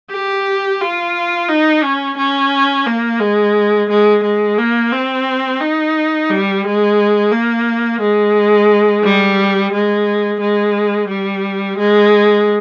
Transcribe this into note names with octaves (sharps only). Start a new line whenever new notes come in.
G4
F4
D#4
C#4
C#4
A#3
G#3
G#3
G#3
A#3
C4
D#4
G3
G#3
A#3
G#3
G3
G#3
G#3
G3
G#3